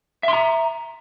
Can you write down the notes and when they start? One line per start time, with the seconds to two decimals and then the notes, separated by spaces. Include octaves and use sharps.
0.23 E5
0.28 C6
0.33 A#5